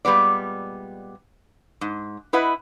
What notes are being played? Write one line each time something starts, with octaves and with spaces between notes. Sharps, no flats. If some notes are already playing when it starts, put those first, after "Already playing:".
A#2 G3 G#3 B3 D5
G#2
E4 B4 D#5 E5 F#5